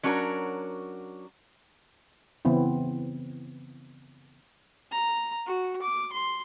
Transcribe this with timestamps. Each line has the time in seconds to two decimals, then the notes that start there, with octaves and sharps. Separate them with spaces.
0.03 F#3 C#4 D4 F#4 G#4 A#4
2.45 C#3 E3 B3 C4 E4
4.91 A#5
5.46 F#4
5.82 D6
6.12 C6